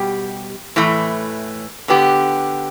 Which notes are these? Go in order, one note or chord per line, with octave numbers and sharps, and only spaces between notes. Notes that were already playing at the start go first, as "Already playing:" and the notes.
Already playing: B2 G3 G4
A2 E3 A3
D3 B3 G4